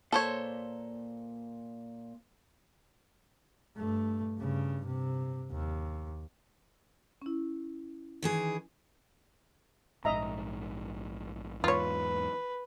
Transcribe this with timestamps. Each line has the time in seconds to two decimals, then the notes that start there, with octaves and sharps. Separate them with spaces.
0.12 A#2 A4 C5 C#5
3.76 G2 A3
4.38 G2 C#3
4.86 C3
5.51 D#2
7.22 C#4 E4
8.22 D#3 E3 G#4
10.05 A#1 G#2 D#5 E5 A#5
11.64 E2 G#2 F4 B4 C#5